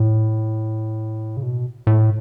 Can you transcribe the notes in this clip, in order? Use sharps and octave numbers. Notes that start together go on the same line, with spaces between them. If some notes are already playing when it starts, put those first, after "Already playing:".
Already playing: A2
C#3
B2
A2